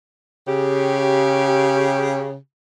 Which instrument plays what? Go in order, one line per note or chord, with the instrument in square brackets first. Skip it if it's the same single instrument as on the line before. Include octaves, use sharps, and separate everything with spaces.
[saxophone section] C#3 G4